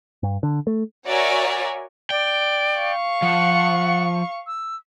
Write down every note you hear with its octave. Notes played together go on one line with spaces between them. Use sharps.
G2
D3
A3
F#4 A#4 C#5 D5 E5 G#5
D5 G5
F5 C#6
F3 F#5
E6